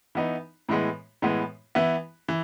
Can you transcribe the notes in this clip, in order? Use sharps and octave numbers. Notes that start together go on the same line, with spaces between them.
E3 B3 D#4
A2 E3 G#3 B3
A2 E3 G#3 B3
E3 B3 E4
E3